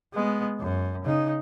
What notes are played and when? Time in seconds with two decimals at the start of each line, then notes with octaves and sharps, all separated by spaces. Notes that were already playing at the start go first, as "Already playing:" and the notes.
0.14 G#3 B3
0.60 F#2
1.05 C#3 D#4